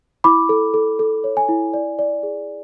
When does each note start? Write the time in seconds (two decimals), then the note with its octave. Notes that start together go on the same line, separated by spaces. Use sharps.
0.24 E4 B5 D6
0.49 A4
0.74 A4
0.99 A4
1.24 C#5
1.37 G#5
1.49 E4
1.74 D5
1.99 D5
2.23 G#4